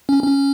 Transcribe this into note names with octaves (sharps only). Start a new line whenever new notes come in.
C#4
C#4